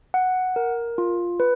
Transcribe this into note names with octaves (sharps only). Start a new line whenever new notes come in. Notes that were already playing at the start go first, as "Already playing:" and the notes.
F#5
A#4
F4
B4